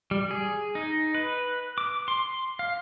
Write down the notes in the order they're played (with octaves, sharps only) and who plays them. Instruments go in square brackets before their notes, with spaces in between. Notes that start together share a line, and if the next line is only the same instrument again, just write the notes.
[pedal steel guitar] G3
G#4
D#4
B4
D6
C6
F5